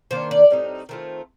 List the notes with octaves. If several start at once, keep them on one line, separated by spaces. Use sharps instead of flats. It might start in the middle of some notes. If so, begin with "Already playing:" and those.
D#3 A#3 D4 C5
D5
A2 G3 C4 D#4
D#3 A3 C4 F4